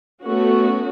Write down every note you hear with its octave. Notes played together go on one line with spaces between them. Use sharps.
A3 B3 C#4 F#4